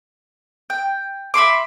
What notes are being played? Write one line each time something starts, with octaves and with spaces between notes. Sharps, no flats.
G5
E5 B5 C6 D6